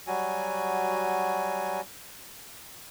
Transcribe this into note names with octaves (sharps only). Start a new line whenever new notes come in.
F#3 G3 F#4 G#5